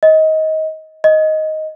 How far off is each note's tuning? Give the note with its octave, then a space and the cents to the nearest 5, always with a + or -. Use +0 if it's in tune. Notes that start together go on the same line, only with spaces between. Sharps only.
D#5 +20
D#5 +5